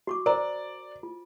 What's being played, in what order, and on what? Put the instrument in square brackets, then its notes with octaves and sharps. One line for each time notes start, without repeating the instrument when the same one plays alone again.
[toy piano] F#4 C#6 D6
[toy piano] A#4 C5 A#5 [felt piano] D5
[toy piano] F4